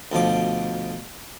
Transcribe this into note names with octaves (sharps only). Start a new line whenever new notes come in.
D2 B2 F3 D6